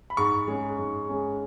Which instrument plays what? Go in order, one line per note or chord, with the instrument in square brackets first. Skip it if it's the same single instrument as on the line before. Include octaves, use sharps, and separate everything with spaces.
[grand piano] B5
G#2 C#6
G#3 C#4
G#2
G#3 C#4